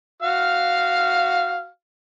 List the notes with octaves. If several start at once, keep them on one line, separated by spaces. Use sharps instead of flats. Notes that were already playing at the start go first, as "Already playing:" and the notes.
F#4 F5 F6